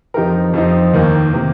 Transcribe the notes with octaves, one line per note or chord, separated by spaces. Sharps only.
F2 F3 D#4 G4 A#4
F2 F3 C4 D#4
D#2 D#3 A#3
C3 D#3 A#3